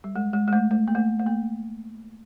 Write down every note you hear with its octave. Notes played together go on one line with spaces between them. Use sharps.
G3
G#3
G#3
G#3
A3
A3
A#3
A3
A3
A#3